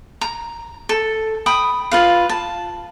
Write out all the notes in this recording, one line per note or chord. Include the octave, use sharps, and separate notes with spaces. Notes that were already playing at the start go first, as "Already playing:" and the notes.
A#5
A4
G5 B5 D#6
F4 B4 F5
A5